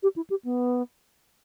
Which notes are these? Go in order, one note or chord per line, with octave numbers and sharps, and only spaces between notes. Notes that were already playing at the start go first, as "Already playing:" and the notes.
G4
E4
G4
B3